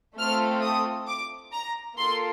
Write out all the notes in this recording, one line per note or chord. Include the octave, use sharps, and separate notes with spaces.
A3 C4 F4 A4 F6
D#6
D6
A#5
A#3 F4 A4 C6